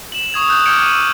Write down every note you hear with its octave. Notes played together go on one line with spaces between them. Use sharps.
E7 F#7
C#6 D#6 G#6 F7
D#6 E6 F#6 G6
D6 F6 G6 G#6 C#7 D7
D#7 F#7
E6